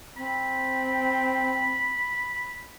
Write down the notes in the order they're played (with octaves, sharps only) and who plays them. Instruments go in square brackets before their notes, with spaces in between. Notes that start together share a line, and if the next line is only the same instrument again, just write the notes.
[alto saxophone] C4 [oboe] B5